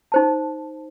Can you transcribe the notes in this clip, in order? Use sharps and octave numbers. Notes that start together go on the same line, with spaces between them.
D#4 C5 A5